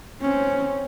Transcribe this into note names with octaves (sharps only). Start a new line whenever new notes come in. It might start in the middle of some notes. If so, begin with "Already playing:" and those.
C4 C#4